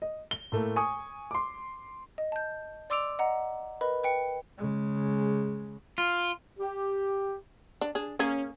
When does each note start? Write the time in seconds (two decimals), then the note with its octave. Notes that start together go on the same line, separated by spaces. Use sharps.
0.02 D#5
0.31 G7
0.52 A2 A3 A#3
0.76 G#5 C#6 D#6
1.31 C6 D6
2.18 D#5
2.32 A5 G6
2.90 D5 C6 D6 E6 D7 F7
3.19 D#5 F#5 A#5
3.81 A#4 B4 D#5 B5
4.04 B4 G5 C#7
4.58 C#3 G#3
5.98 F4
6.59 G4
7.81 D4
7.95 D4 G#4
8.19 A#3 C#4 G#4